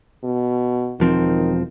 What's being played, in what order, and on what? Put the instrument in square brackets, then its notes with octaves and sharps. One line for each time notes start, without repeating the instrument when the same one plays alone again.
[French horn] B2
[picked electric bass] E1 F3 C4 [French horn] D#3